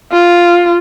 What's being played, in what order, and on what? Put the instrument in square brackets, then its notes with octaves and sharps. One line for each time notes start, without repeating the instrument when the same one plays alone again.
[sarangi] F4